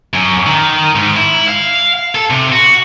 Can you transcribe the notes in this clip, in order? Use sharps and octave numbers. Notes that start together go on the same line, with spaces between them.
F#2
D#3
G#2
E4
F5
A4
C3
F#4